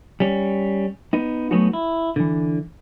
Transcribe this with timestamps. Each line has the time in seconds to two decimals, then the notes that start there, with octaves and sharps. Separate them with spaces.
0.20 G3 C#4
1.13 B3 D#4
1.51 F#3 A3 B3 C#4 D#4 F#4
1.73 E4
2.16 D3 E3